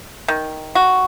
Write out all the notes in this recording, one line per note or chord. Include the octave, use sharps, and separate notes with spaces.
D#3
F#4